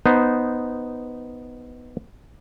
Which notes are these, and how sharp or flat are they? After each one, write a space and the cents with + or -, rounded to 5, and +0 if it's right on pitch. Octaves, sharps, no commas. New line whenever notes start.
B3 +0 D#4 +0 C5 -10